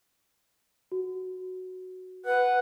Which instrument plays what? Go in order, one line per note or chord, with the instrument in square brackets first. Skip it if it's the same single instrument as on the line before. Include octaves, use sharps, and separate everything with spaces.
[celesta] F#4
[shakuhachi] B4 [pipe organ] F#5